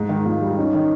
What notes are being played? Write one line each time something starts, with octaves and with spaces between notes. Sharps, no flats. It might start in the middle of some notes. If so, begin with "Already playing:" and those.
Already playing: G#2
D#3
G#2 F4
G3
C#4 D#4
D#3